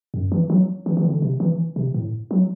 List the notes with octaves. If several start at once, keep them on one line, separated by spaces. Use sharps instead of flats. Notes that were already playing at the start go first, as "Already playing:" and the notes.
F#2
E3
F#3
E3
E3
D3
C3
E3
C3
A2
F#3